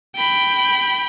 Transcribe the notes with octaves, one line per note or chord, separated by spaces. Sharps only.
G5 B5